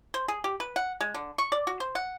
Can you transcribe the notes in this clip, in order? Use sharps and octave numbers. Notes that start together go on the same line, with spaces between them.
C5
G#4
G4
B4
F#5
G#3
D3
C#6
D5
F#4
C5
F#5